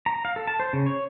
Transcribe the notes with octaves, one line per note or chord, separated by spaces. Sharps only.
A#5
F5
A4
A5
C5
C#3
C#5